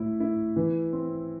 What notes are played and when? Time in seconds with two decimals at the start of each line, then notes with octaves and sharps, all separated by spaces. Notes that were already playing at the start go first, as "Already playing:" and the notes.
Already playing: A2 E4
0.20 E4
0.56 E3
0.93 C4